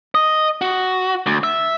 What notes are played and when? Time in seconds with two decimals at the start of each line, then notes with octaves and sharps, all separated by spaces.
0.15 D#5
0.61 F#4
1.26 D2
1.44 E5